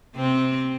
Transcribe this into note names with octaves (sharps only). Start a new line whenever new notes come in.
C3 C4